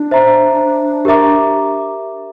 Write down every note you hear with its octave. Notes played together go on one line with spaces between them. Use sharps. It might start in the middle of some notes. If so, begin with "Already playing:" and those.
Already playing: D4
C5 E5 A#5
G4 A#4 E5 A#5 D6